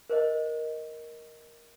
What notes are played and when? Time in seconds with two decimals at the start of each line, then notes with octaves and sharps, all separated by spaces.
0.10 A#4 C5 C#5 D#5